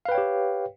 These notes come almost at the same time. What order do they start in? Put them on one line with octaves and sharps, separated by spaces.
F5 B4 G5 C#5 G4